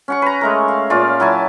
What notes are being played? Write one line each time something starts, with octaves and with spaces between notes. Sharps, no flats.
C#4 F#5 C#6
B4 A#5
G#3 A3 A#4
F5
A#2 C#4 F4 D5
F#3 E4 G#5 A5